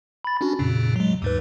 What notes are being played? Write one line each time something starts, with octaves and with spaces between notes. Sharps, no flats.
B5 A6
C#4 D4 F#4
F2 A#2 C#3
F#3 G#3
D#2 G#2 B4